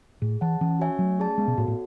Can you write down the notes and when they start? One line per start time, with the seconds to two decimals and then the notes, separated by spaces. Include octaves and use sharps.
0.22 A2 G#4
0.41 E3 C#5 F#5 A5
0.61 E3 C#4
0.79 F#4 C#5 E5 G#5
0.99 F#3 A3
1.18 C#4 G#4 D5 A5
1.38 G#3 B3
1.48 B2
1.57 A2 F#4 A4 C#5
1.68 A2